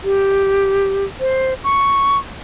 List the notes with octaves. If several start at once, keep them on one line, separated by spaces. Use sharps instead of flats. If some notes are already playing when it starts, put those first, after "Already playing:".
G4
C5
C#6